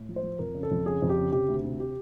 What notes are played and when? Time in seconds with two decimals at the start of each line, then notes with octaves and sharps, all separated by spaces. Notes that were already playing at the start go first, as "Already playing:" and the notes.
Already playing: A2
0.09 F3
0.16 C5
0.23 F3
0.39 F2 A#4
0.55 C#3
0.63 A4
0.71 F2
0.86 C#3 G#4
1.02 F2
1.09 G4
1.18 C#3
1.32 C3 G4
1.48 D2
1.64 C3
1.80 G4